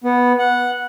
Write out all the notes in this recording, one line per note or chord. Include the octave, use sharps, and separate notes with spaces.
B3
F#5